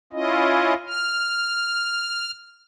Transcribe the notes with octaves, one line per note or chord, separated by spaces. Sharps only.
C#4 E4 F4 D#5
F6